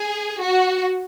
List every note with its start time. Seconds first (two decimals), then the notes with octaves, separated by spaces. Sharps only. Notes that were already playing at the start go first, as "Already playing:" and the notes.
Already playing: G#4
0.42 F#4